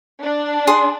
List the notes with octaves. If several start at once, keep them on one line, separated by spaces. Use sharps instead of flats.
D4
G#4 C6